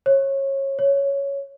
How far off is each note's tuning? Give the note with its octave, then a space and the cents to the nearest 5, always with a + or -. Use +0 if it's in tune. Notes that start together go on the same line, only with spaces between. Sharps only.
C#5 -25
C#5 +5